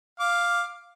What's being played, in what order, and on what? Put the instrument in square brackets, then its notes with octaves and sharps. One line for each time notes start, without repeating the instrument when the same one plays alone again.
[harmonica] F5 D6